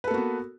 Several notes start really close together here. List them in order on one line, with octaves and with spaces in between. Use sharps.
B4 A4 A#3 F#4 B3